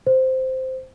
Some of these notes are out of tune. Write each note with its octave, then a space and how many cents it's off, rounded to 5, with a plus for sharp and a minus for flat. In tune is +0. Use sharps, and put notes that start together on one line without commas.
C5 -5